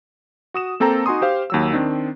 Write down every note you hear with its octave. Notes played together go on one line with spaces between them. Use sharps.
F#4 D#6 E7
A#3 C4 A4 G5 A#5
D#4 F#4 G#5 C6 D#6
G4 C5 F5
D#2 F#3 E6
D#3 C4 D4